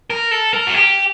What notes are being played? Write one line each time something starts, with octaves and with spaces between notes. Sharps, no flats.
A#4
A4
A#4
F#4
G4